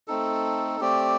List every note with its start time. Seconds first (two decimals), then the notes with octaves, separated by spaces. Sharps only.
0.08 A3 C4 D#4 A4
0.80 A3 C4 G4 D5